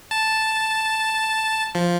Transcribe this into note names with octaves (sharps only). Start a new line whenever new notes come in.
A5
F3